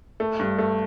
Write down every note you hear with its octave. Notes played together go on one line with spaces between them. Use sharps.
A3
G2
A3